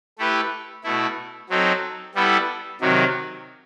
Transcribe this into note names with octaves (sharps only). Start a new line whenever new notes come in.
A3 E4 G4 B4
B2 A3 E4
F#3 C4 D#4 A4
G3 B3 E4 A4
C3 D#3 F#3